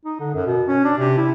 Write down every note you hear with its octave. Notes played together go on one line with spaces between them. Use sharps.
D#4
D3
F#2
B2
C#4
D4
C3
E4